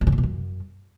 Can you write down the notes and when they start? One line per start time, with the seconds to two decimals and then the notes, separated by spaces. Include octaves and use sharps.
0.01 G2
0.07 C#3
0.12 G2
0.18 B2
0.23 F#2